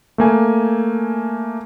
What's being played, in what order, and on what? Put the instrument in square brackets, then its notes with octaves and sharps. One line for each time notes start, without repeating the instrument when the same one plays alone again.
[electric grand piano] A3 A#3 G#5